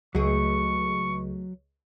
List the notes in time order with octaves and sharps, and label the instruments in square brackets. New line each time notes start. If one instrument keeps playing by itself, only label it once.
[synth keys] C#2 [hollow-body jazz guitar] F#3 [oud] A3 G#4 [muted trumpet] C#6